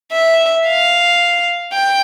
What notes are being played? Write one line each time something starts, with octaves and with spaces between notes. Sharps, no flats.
E5
F5
G5